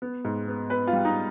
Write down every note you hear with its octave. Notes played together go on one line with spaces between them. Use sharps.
B3
G#2
B3
B3 B4
F4
G3
D#4